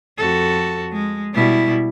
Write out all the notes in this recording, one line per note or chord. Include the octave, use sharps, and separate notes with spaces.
F2 F#4 A4
G#3
B2 G3 E4